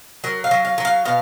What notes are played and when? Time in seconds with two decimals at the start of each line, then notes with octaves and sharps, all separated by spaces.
0.24 F#3 A#4
0.44 F5
0.51 F#3
0.65 F5
0.78 F#3
0.85 F5
1.05 B2 F5